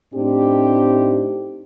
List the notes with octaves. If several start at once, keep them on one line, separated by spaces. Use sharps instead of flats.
A2 C4 D4 D#4 G4